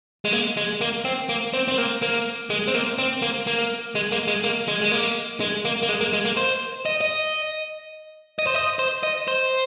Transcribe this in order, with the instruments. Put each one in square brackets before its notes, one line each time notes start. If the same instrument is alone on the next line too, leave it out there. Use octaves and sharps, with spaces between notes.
[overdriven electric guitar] G#3
A#3
G#3
A#3
C4
A#3
C4
C4
A#3
A#3
G#3
C4
A#3
C4
A#3
A#3
G#3
A#3
G#3
A#3
G#3
G#3
A#3
G#3
A#3
A#3
G#3
A#3
G#3
A#3
C5
D#5
D#5
D#5
C5
D#5
C5
D#5
C5